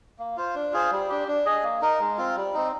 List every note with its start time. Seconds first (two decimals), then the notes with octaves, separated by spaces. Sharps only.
0.19 A#3
0.37 F4 C5
0.55 D4
0.73 F4 G#4 C5
0.91 G3
1.09 D4 G4
1.28 D4
1.46 G#4 D#5
1.63 A#3
1.82 D#4 A#4
2.00 G#3
2.18 C4 F4
2.37 G3
2.54 C4 D#4